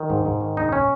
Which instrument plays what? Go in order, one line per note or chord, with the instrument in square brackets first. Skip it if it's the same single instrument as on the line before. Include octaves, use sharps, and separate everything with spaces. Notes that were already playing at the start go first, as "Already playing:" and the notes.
Already playing: [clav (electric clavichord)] D#3
G#2
G#2
D#3
G#3 D#4
C#4